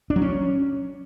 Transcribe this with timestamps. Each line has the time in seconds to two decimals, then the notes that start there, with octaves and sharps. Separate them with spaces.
0.10 D4
0.16 F#3
0.22 C#4